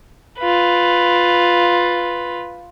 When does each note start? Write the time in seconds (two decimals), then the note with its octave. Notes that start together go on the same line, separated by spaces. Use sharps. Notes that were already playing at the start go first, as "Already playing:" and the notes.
0.39 F4 B4